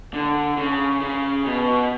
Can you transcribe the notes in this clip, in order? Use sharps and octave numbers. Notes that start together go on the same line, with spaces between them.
D3
C#3
C#3
B2